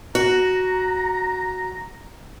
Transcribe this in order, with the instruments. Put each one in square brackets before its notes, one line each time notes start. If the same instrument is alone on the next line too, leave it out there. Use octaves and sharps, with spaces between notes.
[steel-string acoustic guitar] F#4 [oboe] A#5